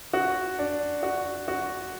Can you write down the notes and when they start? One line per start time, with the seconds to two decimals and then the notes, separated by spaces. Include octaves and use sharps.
0.13 F#4
0.59 D4
1.03 F#4
1.48 F#4